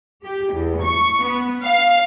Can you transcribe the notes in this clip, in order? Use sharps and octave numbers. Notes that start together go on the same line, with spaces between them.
G4
E2
C#6
B3
F5